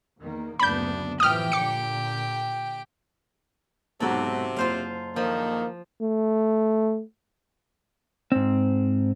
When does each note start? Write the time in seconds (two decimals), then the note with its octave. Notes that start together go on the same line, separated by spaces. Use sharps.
0.20 E2 D#3 A#3
0.60 F#1 D2 B3 D4 B5 G6
1.20 A2 E3 F3 G4 G5 D#6 F6
1.52 A#2 D3 D6 C#7
4.00 B1 G#2 C3 F#3 F#4 A4
4.56 F#1 F4 C5 F5
5.16 D3 D#3 F3 A#3
6.02 A3
8.32 G#2 C4